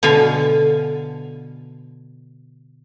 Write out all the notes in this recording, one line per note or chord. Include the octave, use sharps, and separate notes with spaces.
B2 D3 F5 G#5